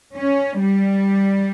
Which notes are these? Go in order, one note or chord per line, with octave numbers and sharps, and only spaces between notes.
C#4
G3